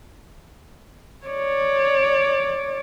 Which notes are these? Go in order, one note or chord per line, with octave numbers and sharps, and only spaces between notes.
C#5 D5